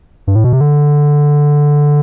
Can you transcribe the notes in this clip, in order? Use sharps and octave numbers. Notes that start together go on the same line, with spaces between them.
G2
A2
B2
C3
D3